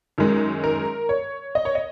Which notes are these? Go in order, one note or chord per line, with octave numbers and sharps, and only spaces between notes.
F#2 D#3 G#3
A#4
C#5
D#5
C#5
D#5